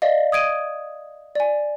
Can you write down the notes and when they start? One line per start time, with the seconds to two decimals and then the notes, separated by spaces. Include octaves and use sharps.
0.02 D5 D#5 F5
0.32 D#6 G#6 D7 D#7
1.35 D5 G#5